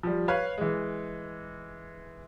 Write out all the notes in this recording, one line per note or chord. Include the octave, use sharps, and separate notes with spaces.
F3 G3
B4 C#5 F5 B5
E3 G#3